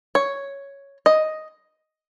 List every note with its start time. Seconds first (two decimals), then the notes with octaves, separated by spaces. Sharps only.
0.15 C#5
1.06 D#5